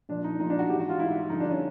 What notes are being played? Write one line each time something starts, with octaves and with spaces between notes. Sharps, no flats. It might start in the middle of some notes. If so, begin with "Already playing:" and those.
A#2 F3 D4
D#4
A#2 F3 D#4
D4
F#4
G#2 E3 G4
F#4
F4
G#2 E3 E4
G2 D3 F3 D#4
D4
C#4